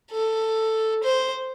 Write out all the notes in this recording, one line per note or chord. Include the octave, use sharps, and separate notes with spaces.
A4
C5